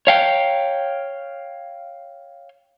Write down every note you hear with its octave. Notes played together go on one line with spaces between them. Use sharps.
C#5 F5 G5